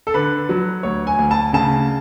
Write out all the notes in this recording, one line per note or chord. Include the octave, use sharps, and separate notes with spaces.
A4
D3 B4
F#3
D2 C#5
G#5
D2
A5
C#3 A5